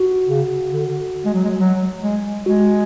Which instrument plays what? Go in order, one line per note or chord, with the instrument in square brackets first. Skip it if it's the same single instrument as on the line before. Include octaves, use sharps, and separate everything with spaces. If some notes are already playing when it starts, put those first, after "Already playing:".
Already playing: [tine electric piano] F#4
[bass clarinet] C#3
D3
G#3
F#3
G#3
F#3
G#3
[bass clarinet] G#3 [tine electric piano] F#4